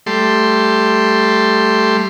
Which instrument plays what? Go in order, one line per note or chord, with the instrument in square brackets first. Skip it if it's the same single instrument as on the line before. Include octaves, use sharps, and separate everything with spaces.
[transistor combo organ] G3 A3 C6